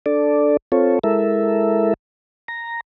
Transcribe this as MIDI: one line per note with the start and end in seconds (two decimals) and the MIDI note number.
0.06 0.57 62
0.06 0.57 69
0.06 0.57 74
0.72 0.99 60
0.72 0.99 65
0.72 0.99 69
0.72 0.99 73
1.04 1.94 56
1.04 1.94 64
1.04 1.94 69
1.04 1.94 70
1.04 1.94 76
2.48 2.81 82